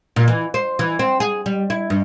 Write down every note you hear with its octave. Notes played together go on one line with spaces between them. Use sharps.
A#2
E3
C5
E3
C4
G#4
G3
E4
G2